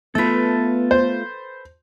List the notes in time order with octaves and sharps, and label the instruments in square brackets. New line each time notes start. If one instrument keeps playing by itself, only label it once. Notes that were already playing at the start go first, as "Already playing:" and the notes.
[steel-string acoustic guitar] A3 F4 [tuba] B3 [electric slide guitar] A4 B4
[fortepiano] C5